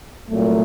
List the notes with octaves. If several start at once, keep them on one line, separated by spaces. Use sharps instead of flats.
C2 A#2 F#3 A3